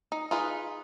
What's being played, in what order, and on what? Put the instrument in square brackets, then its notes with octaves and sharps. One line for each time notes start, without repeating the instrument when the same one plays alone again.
[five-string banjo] D#4
D#4 F4 G#4 B4